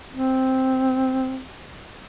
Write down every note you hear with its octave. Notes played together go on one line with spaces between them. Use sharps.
C4